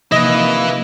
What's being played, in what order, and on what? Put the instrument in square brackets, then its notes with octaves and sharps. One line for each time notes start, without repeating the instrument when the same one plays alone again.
[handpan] C3 F3 D#4 [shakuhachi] A#3 [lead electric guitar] E4 B4 [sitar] D#5